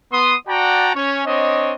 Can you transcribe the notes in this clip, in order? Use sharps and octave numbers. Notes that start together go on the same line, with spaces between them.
B3 C6 D#6
F#4 D5 F#5 G5 A5 A#5
C#4 C#5
C4 D4 C#5 D#5